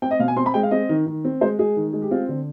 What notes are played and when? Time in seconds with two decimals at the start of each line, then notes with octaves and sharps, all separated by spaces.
0.02 C4 G5
0.11 D#5
0.19 B2 F5
0.28 G#5
0.37 C4 C6
0.46 B5
0.54 G#3 G5
0.63 F5
0.71 C4 D#5
0.89 D#3
1.06 D#3
1.25 C4
1.41 G#3 C5
1.59 G#3 G#4
1.77 D#3
1.93 G#3
2.02 G4
2.11 C4 F4
2.29 D3